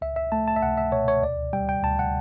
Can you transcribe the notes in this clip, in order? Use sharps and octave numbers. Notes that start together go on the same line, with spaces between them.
C#2 E5
E5
A3 A5
A5
E5
C#2 F#5
E5
B2 C#5
C#5
D2 D5
G3 G5
G5
D2 A5
F#5